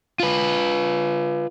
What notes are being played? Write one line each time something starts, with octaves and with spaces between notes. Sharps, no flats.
F4 B4